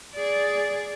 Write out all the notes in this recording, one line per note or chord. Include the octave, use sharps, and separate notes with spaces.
G#4 D5